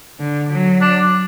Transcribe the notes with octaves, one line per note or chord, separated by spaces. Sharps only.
D3
F#3
D4